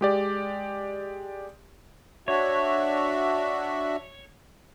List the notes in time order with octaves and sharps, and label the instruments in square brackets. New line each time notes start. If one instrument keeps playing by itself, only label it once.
[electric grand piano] G#3 G4 D5
[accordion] D4 F#4 E5 [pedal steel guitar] C#5